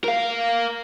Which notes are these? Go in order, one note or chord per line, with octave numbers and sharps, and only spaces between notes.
A#4 F5